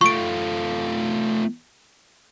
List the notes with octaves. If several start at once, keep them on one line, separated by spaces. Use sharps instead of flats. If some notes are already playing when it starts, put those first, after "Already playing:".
A3 F4 C#6 D7